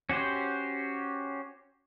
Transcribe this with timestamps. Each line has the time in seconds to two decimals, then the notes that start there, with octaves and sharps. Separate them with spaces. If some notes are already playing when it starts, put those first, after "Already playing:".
0.09 C#4 F#4 G4 C5